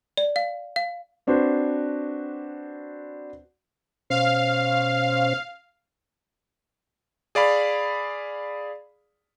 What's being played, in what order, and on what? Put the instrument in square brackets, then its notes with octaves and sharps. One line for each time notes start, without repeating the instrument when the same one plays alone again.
[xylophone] D5
F5
F5
[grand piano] C4 D4 F#4 B4 C5
[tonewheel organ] B2 C#4 C5 [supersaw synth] F5
[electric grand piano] G#4 D5 F5 B5